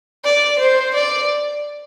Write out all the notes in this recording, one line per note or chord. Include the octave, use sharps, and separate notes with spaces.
D5
C5
D5